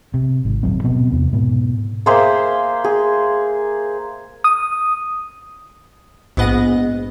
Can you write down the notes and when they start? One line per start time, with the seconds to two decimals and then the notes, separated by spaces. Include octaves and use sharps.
0.14 C3
0.45 G#1
0.63 D#1 F#3 C4
0.84 B2 B3 C4
1.12 E2 C3
1.33 G#2 B2 B3
2.06 A#3 G#4 C5 E5
2.84 G#4
4.44 D#6
6.37 A#1 G#2 B3 D#5 F#5 A#6